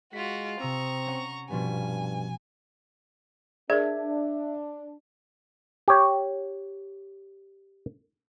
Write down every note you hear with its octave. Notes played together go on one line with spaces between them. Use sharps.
G#3 F4 F#4 B6
C3 C4 A#5 C#6 D#6 E6
C#4 F#5
G2 B2 F3 B3 G#5
D4 G#4 A#4 D5 E5
G4 C#5